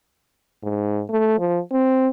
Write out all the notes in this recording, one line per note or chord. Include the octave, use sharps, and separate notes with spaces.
G#2
A3
F3
C4